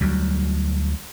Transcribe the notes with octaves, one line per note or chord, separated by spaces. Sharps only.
D2 F#3 G3